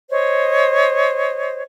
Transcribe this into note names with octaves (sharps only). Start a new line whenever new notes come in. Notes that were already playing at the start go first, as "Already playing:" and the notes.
C5 C#5 D#5